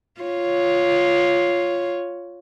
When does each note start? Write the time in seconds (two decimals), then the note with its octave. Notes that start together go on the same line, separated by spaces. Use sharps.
0.21 F4 C#5